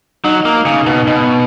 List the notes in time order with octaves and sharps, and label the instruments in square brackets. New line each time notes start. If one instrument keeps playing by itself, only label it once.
[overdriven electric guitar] F#3 [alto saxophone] D#4
[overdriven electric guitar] A#3
C#3
B2
B2